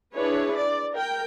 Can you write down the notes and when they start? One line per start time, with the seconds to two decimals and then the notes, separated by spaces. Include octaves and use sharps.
0.15 D4 E4 G#4 B4 C#5
0.57 D5
0.94 A#4 G5